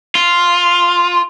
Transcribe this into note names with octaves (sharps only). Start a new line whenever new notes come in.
F4